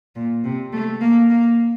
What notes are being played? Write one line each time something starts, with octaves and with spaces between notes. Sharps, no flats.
A#2
C3
A3
A#3
A#3